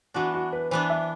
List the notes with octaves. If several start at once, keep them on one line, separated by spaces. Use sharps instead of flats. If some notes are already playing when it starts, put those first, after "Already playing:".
E3 B3 D4 F#4
F#4
B4
E3 B3 D4 C5
E5